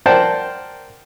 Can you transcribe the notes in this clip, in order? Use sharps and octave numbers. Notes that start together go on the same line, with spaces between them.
A#4 C5 D5 F#5 G5 A5